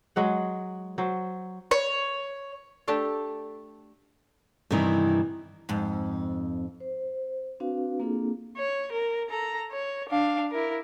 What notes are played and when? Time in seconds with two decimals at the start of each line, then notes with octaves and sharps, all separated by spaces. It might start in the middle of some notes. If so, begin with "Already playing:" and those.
0.16 F#3 G#3 F#5
0.98 F#3 C5
1.71 C#5
2.88 A3 D4 G4 A4
4.71 G2 C3 D#3 E3 B3 D#4
5.69 F2 G#2
6.80 C5
7.60 C4 D4 F#4 B4 F5
8.00 A#3 C4 D4 F4 G#4 A4
8.57 C#5
8.92 A#4
9.30 A4 A#5
9.72 C#5
10.09 D4 F5
10.51 E4 A#4